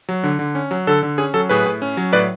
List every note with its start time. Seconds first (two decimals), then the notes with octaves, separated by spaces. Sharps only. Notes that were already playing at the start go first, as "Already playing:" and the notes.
0.09 F#3
0.23 D3
0.39 D3
0.55 C#4
0.71 F#3
0.87 D3 A4
1.03 D3
1.18 C#4 G#4
1.34 F#3 A4
1.49 A2 G#4 B4
1.66 A2
1.82 C#4
1.97 F#3
2.13 A2 B4 D5